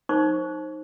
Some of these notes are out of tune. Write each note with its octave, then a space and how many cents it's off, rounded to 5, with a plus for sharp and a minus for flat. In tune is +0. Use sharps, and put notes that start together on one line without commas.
D#4 +0 C5 +25 C#6 +20